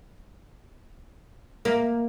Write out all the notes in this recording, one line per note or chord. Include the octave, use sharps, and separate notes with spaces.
A#3